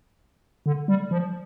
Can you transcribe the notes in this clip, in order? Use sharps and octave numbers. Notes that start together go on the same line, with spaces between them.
D3
G3
F3